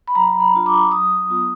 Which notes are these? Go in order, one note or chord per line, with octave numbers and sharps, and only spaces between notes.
B5
F#3 A#5
B5
D4 F4
D6
F#3 D#6
B3 F4